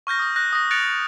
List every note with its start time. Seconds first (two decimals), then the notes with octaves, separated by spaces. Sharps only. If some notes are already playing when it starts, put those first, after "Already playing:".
0.07 C#6 F6 G6 A#6
0.19 D#6 A#6
0.36 F#6 A#6
0.53 D#6 A#6
0.71 F#6 A6 A#6 C#7 D7 F7